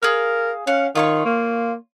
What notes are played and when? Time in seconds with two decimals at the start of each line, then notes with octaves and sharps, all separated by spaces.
0.03 G#4 A#4 F5 F6
0.67 C#4 F5 F#5
0.95 D#3 F4 C#5 C#6
1.25 A#3